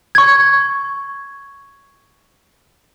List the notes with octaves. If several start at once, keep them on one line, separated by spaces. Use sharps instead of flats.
C#6 G#6